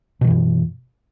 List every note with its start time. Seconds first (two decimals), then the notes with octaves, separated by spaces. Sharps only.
0.21 B2
0.24 D#3
0.27 E3
0.30 F#2